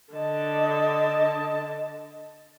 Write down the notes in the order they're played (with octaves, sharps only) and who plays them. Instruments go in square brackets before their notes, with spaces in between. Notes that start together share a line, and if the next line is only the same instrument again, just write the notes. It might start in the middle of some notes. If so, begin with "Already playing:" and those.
[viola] D3 A5 [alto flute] D#5